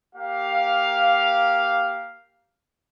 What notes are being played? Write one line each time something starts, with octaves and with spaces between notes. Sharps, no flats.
A#3 G4 F5